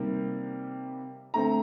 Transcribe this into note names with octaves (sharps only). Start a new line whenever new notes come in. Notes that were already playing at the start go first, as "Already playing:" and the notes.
Already playing: C3 D#3 G3 A#3
D3 A3 C4 A#5